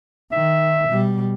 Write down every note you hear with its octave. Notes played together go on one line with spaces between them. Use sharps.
D#3 E5
B2 G3